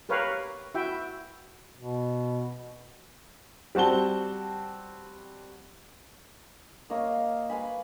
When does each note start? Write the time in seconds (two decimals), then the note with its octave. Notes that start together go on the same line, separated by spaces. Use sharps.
0.09 G4 A#4 B4 C#5 F5
0.75 E4 F#4 E5 G5
1.77 B2
3.75 G3 C4 F#4 A5 G7
6.90 A#3 C#5 D#5 F5
7.50 B4 F5 G#5 B5